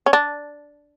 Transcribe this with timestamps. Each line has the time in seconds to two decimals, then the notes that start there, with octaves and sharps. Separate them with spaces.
0.06 C#4
0.13 D4